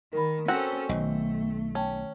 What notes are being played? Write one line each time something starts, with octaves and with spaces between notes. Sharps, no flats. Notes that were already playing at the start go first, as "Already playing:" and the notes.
D#3 A#4 B5
C4 C#4 F#4 A4 F#5
B1 D#3 A3 D#5
C#4 G5 A5